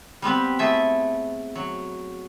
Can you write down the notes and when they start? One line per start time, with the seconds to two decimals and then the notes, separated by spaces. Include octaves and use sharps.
0.22 G3 B3 C4 B4
0.59 A3 E4 G#4 A4 E5
1.55 F#3